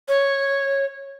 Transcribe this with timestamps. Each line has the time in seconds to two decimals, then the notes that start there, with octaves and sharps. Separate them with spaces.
0.09 C#5